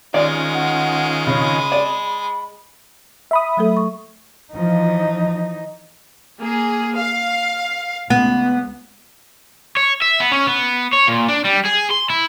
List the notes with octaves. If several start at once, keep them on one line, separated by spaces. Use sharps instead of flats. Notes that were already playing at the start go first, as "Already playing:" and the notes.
D#3 G#3 C#4 F4 D5
F#5
C#3 B5
D5
E5 B5 D#6
F#3 A3 A4
C#6
E3 F3 D#4
A#3 G#4
F5
C#2 B3
C#5
E5
B3
C#4
B3
C#5
A#2
D4
G3
G#4
C6
E4